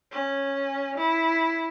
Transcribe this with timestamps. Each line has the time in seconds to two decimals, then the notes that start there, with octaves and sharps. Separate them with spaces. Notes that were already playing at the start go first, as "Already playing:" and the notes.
0.11 C#4
0.97 E4